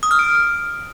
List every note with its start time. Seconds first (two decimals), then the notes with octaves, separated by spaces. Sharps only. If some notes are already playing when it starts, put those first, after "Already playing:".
0.03 D#6
0.11 F6
0.19 D7